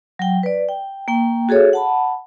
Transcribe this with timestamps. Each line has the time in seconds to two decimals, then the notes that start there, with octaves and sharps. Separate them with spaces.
0.19 F#3 G5
0.43 B4 D5
0.69 G5
1.08 A#3 G5
1.49 F#4 G#4 A4 C#5 E5
1.73 F#5 A5 B5